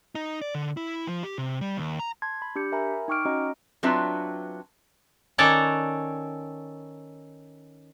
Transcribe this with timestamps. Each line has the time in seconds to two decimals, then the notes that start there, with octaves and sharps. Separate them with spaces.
0.15 D#4
0.41 D5
0.55 D3
0.77 E4
1.07 F3
1.23 G4
1.38 C3
1.61 G3
1.77 D#2
1.99 A#5
2.22 A5 C6 G#6
2.42 B5
2.56 D4 G4 G6 C#7
2.72 A#4 E5 G#5 A#5 B5
3.08 D#4 G5 C#6 D6 F6 D7
3.25 C#4 F#4 D#5 A#5
3.83 F#3 C4 D4 F4 B4 E5
5.38 D#3 C#4 A4 C#5 D5 F#5